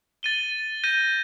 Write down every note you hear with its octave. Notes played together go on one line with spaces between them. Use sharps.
A6 D#7 G7
G6 A#6 D#7